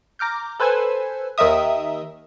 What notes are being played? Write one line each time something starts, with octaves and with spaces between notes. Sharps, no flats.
A#5 D6 F6 G6
A4 B4 C5 G#5 E6
D#2 D#3 A#4 D#5 E5 D#6